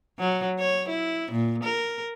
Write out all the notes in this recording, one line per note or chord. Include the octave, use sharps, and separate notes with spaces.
F#3
C#5
E4
A#2
A#4